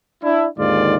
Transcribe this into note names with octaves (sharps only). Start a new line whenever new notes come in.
D4 E4
G#1 D#2 G#2 D3 F4 D5